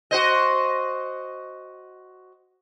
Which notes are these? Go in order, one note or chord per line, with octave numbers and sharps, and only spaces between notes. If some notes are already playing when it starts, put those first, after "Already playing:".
F#4 C5 D#5